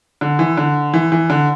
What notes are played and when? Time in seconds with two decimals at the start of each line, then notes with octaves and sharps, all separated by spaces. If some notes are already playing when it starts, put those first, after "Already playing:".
0.21 D3
0.39 E3
0.57 D3
0.94 E3
1.12 E3
1.30 D3